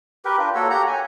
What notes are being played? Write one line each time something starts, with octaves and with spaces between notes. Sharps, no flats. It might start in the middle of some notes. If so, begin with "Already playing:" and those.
G4 A#4 B4
D4 F4
A#3 F#4 A4 C#5
G4 F#5 A#5
G#5